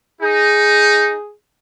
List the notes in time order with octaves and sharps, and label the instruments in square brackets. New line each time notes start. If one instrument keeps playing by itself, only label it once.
[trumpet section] D#4 [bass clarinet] G#4